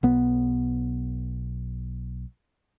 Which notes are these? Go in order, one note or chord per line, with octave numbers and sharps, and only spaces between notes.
B1 B3